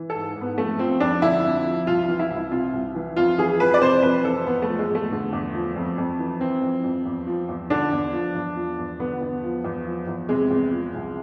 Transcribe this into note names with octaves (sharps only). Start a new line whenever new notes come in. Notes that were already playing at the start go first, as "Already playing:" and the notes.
Already playing: E3
A4
G#2
G#2
B3
F2 A3
F3 C4
F2 D4
D3 E4
F2
F3
C2 F4
F4
E3
E4
C2
E4
C3 F4
C2
E3
F2 F4
E3 G#4
F2 B4
D5
C3 C5
F2 B4
E3 A4
E2 B3
A3
F3
G#3
E2 A3
D3
E2
F3
F2
F2
E3
E3 C4
F2
F2
E2
F3
E2
D3 D4
E2
F3
E2
F3
E2
D3 B3
E2
F3
E2
F3
E2
C3 G#3
E2
F3
C2